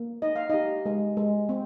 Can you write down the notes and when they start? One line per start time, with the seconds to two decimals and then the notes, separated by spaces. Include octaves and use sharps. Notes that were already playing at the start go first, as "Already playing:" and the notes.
Already playing: A#3
0.22 D#4 D#5
0.36 F5
0.50 D#4 G4 D#5
0.86 G#3
1.17 G#3
1.49 C4